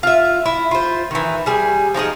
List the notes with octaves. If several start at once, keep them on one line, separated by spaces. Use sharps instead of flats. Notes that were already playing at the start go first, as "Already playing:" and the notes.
F4 E5
E4
F4 C5
D#3 E3
G3 G#4
F3 D#4 F#4 G#4